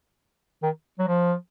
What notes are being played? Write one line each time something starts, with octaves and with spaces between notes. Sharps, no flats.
D#3
F#3
F3